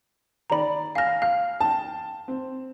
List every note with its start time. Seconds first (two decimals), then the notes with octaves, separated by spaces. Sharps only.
0.50 D#3 D5 A#5 B5
0.95 F5 G#5 F6 A#6
1.22 F5 F6
1.61 G5 A5
2.28 C4